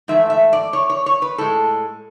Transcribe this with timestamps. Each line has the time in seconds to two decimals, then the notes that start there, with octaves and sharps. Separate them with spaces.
0.08 G#2 E3 A3 E5
0.30 E5
0.53 D5
0.73 C#5
0.90 C#5
1.06 C#5
1.22 B4
1.38 A2 G#3 A4